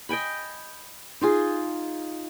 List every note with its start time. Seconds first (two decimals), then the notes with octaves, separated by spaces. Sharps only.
0.09 D#5 G5 G#5 B5
1.21 D#4 F4 G#4